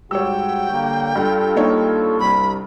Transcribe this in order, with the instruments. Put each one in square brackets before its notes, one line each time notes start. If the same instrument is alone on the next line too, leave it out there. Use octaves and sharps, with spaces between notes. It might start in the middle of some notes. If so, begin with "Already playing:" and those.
[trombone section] G#2 F#4 [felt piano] G3 C#5 [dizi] G5 [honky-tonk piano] E6
[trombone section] D3 A#3
[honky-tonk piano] G2 [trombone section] F4 A4
[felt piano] A#3 D#4 C#5
[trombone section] C2 [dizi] B5